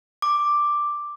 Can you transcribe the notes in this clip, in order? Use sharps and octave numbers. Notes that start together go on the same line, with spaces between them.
D6